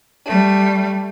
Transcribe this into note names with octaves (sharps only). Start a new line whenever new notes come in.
G3 A3